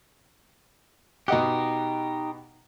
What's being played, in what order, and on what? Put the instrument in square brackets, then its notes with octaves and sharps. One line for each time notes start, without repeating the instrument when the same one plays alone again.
[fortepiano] B2 D#5 F#5 [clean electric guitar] D#4 G4